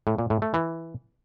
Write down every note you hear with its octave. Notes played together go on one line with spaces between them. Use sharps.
A2
A#2
A2
A3
E3